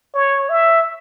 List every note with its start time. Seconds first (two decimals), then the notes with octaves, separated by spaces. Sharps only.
0.14 C#5
0.49 E5